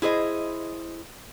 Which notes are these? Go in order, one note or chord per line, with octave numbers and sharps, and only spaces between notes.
E4 G#4 C5 D#5